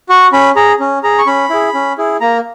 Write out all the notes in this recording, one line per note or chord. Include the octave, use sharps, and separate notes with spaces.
F#4 C#6
C#4 B5
G#4 A#5
C#4
G#4 A#5
C#6
C#4 B5
E4 G#4
C#4
E4 G#4
A#3 A#5